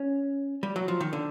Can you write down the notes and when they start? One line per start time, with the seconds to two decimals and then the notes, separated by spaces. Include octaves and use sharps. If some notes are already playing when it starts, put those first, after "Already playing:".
Already playing: C#4
0.63 G3
0.76 F#3
0.88 F3
1.00 D#3
1.13 D3